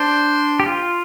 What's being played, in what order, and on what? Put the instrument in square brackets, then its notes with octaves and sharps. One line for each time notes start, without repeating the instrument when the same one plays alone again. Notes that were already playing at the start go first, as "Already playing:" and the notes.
Already playing: [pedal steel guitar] D4 [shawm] C5
[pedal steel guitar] G4
F4